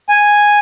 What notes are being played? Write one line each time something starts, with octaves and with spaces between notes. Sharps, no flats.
G#5